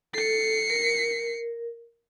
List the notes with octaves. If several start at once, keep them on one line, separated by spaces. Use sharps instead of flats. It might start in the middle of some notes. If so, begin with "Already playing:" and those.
A4 C7 C#7
A#4